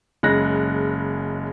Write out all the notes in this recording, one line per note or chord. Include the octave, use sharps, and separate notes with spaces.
F#1 C#3 G#3 F#6 A#6